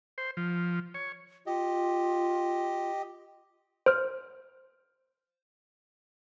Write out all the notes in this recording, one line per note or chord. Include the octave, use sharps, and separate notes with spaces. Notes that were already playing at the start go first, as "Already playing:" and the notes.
C5
F3
C#5
F4 G4 D#5
C5 F6